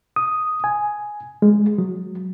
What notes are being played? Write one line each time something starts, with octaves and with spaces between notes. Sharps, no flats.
D#6
G#5
G#3
F#3